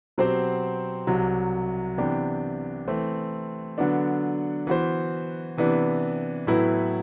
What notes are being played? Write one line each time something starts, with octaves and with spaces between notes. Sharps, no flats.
B2 F#3 C4 G4 C5
C2 C3 F#3
C3 E3 B3 D4 G4
E3 A3 C4
D3 F#3 B3 D4
E3 B3 F#4 C5
C3 E3 B3 D4
A2 F#3 B3 E4 B4